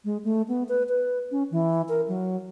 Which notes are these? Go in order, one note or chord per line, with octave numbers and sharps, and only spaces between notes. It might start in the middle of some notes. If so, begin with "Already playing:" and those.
G#3
A3
B3
B4
B4
C#4
E3
A#4
F#3